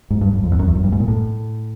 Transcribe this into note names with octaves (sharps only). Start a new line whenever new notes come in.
G#2
G2
F#2
F2
E2
F#2
E2
F#2
G2
G#2
A#2
A2